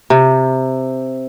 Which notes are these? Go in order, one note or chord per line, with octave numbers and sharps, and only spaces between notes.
C3